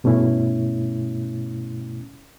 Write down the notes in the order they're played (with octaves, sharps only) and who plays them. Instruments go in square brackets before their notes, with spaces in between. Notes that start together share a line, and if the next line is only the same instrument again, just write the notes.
[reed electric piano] G2 B2 A3 C#4 E4